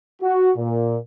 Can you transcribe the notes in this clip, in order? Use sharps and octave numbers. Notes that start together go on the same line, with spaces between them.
F#4
A#2